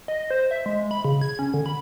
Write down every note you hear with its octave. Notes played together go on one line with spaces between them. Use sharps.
D#5
C5
E5
G#3
B5
C#3
G#6
C#4
D3
B5